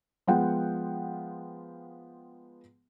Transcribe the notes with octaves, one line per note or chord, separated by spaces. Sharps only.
F3 G#3 B3 F4 F#5 G5